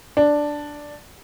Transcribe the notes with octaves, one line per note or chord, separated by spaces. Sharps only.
D4